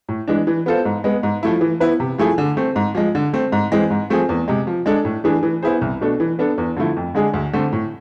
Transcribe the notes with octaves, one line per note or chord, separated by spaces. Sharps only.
A2
E3 G#3 D4
E3
B3 F4 A4 C5
G#2
G#3 B3
G#2
F3 A3 E4
E3
B3 E4 B4
C3
F3 A3 E4 G#4
D3
A3 C4
G#2
F3 G#3
D3
A3 C4
G#2
E3 G#3 C4 G#4
G#2
F3 A3 C4 G#4
E2
C3 G#3
F3
G#3 D4 A4
A2
E3 A3 D4 G#4
E3
B3 E4 G#4 C5
C2
B2 A3 D4 A4
E3
B3 D4 A4
E2
D3 F3 A3 E4
F2
D3 G#3 D4 G#4
D2
D3 A3 C4
A2